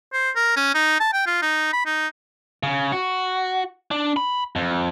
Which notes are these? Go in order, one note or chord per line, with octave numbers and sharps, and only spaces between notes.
C5
A#4
C#4
D#4
A5
G5
F4
D#4
B5
D#4
C#3
F#4
D4
B5
F2